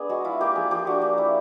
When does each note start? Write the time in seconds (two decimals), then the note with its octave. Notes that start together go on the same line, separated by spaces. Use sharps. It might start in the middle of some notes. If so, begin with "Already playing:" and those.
Already playing: B3 D4 G#4
0.09 G#3 F#4
0.24 E4 F4
0.41 A#3 G4
0.56 F3 G#4
0.71 F3 G4
0.87 D4 F#4
1.01 A#3 G4
1.18 E4